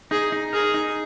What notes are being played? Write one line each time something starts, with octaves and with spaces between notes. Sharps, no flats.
D#4 G#4
D#4
G#4 A#4
D#4